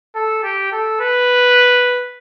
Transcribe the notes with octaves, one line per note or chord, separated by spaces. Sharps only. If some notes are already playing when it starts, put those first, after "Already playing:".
A4
G4
A4
B4